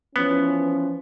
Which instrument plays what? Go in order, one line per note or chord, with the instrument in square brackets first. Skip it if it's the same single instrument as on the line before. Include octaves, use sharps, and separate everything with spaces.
[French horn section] E3 F3 C#4 [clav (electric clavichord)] B3